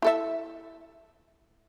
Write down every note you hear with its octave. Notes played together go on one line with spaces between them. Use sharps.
E4 A4 E5